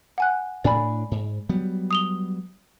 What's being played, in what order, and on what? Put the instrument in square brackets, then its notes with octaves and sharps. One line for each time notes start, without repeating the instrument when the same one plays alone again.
[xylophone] F#5 G#5 F#6
[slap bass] A2 D4 [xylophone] D5 G#5 B5
[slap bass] G#2
F#3 G3 B3
[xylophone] D#6 F7 G7